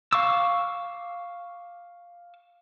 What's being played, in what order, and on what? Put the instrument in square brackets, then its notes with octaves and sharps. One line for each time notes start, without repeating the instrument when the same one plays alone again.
[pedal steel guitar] F5 C#6 D6 E6